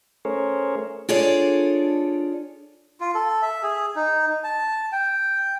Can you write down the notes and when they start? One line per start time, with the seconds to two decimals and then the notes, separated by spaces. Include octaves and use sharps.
0.25 A3 C#4 G#4 A#4 C5 C#5
1.09 D4 F4 G#4 A4 C#5 D5
3.01 F4
3.15 A4
3.42 E5
3.63 G#4
3.96 D#4
4.44 A5
4.92 G5